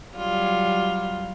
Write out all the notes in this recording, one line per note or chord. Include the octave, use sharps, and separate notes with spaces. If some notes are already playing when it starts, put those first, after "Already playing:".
F#3 G3 F4